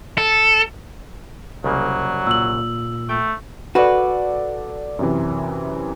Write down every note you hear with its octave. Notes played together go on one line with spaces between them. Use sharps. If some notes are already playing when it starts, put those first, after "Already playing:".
A4
C2 C#3 F#3 A#3
A#2 E6 F#7
A3 G5
F#4 A4 B4 D5
F#2 C3 E3